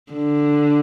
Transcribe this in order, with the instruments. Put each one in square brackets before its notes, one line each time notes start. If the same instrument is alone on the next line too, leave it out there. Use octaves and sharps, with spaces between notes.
[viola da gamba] D3